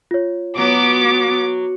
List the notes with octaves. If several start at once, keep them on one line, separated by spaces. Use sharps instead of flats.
F4 C#5
F#3 B3 D6